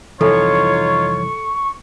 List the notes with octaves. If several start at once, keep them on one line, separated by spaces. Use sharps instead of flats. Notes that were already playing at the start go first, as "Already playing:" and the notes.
C2 F2 E3 D#4 F4 A4 C#5 C#6